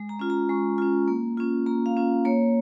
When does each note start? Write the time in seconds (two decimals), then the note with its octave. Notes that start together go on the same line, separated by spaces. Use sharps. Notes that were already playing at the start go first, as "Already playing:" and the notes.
Already playing: G#3
0.09 A#5
0.19 C#4 F4
0.30 A#5
0.49 G#3 C#6
0.78 C#4 F4
1.08 A#3
1.37 C#4 F4
1.66 A#3 A#5
1.86 F5
1.97 C#4 F4
2.25 A#3 C#5